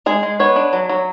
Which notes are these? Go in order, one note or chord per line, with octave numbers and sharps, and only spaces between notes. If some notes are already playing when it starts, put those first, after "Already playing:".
G#3 G#4
G#3
B3 C#5
D4
F#3
F#3